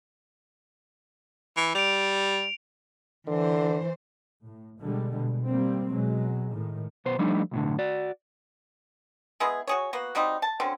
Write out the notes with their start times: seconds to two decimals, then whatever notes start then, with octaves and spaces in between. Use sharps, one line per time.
1.57 E3
1.75 G3 D7 F7
3.28 D3 E3 C5
4.44 A2
4.80 B2 D3 G3 G#3
5.16 B2
5.47 G3 A#3 C4
5.91 B2 F#3 G#3
6.52 A2 D#3
7.05 B1 B3 C5
7.19 F3 G3 A3 D4 D#4
7.51 B1 A2 D3
7.79 F#4 D5
9.40 G#3 B3 E4 G#4
9.68 F#4 G#4 C#5
9.93 A#3 B3 F#4
10.15 F#3 G3 C4 D#4
10.42 A5
10.60 D3 F#3 C4 C#4